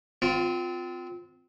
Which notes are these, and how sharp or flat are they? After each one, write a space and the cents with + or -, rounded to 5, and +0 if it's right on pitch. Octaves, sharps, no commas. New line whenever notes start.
C4 -25 F4 +15